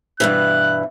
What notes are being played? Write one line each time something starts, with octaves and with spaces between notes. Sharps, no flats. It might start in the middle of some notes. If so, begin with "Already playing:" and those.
G2 B2 E3 F#6